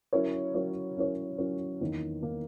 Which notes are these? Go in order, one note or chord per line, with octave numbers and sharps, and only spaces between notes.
F#3 C#4 E4 A#4 C#5
F#3 C#4 E4 A#4 C#5
F#3 C#4 E4 A#4 C#5
F#3 C#4 E4 A#4 C#5
E2 D#3 A#3
D#3 A#3